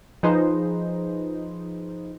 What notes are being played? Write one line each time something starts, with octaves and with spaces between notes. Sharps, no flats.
F3 D#4 G#4 B4 C5 D#5